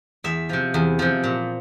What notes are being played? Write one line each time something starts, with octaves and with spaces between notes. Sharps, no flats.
E2 E5
C3 F3
E2
C3 F3
A#2